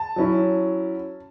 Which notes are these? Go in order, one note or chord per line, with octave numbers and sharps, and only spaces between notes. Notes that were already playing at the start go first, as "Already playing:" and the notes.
Already playing: A5
F#3 C#4 E4